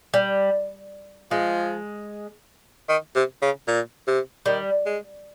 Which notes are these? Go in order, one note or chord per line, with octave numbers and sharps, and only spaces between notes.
G3
F3 G#3
D#3
C3
C#3
A#2
C3
D#3 G3
G#3